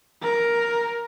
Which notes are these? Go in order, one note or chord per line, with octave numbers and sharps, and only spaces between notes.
A#4